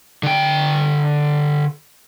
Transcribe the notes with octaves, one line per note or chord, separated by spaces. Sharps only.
D3 G5